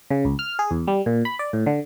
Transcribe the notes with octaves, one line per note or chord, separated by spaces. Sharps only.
C#3
C#2
F6
G#4
E2
G3
A#2
B5
D5
A2
D3